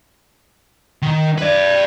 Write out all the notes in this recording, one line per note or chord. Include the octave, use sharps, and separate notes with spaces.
D#3
B4 D5